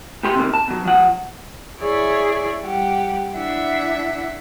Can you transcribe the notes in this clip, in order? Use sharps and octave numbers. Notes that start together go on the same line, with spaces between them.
A#2 G4 C6
C3 D#3 A#3
A5
B2 F#3
F3 F#5
E4 G#4 C#5 D5 E5
G3 G4 F#5
D4 E4 E5 F#5